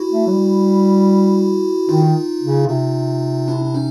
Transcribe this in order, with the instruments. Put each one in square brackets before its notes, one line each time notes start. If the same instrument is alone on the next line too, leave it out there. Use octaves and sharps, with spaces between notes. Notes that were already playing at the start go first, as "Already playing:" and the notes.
Already playing: [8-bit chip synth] E4 F#4
[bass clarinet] A3
F#3
G3
[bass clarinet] D#3 [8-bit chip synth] D#4 F4
[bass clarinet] C#3
[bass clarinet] C3 [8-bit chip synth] D#4 F4
[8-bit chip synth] D4 E4
D4
C#4 D#4